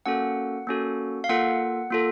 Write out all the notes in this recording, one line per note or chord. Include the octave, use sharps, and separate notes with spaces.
A#3 C#4 F#4 A4 F#5
A#3 C#4 F#4 A4
F5
A#3 F4 A4 F#5
A#3 F4 A4